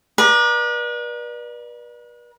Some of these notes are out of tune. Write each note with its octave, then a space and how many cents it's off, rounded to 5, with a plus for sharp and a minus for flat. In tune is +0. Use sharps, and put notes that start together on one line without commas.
B4 -40 D5 +25 A#5 +15